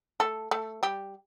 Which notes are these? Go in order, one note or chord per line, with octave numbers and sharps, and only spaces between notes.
A3 A4
A3 A4
G3 G4